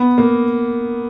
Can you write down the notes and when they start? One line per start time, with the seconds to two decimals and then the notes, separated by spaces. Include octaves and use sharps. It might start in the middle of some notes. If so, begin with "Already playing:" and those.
Already playing: B3
0.18 A#3